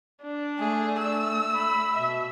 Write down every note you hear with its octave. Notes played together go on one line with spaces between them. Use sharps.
D4
A3 G#4
E6
B5
B2 E5